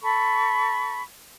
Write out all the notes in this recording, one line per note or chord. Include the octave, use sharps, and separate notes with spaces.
A4 B5 C#6